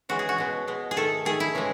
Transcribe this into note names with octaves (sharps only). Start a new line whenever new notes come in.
C#3 E3 G#3 F#4
G#4
F#4
B2 G#3
B2 G#3
G#4
D#3 A3 A4
D#3 A3 G#4
E4
C#3 E3 G#3